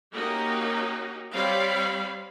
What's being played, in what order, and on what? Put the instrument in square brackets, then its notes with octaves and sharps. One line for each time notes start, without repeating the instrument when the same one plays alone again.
[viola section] A#3 C#4 D#4 F#4 G4
G3 C4 C#5 D5 F5 B5